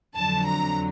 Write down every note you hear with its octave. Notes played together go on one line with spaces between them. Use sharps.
F2 D3 F#3 A5
A#5